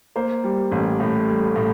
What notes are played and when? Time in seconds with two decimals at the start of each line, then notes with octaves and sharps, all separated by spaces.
0.16 A#3 C5
0.44 G3
0.72 A1
1.00 A2
1.28 G3
1.56 A2